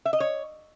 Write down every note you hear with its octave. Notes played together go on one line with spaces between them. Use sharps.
E5
D#5
C#5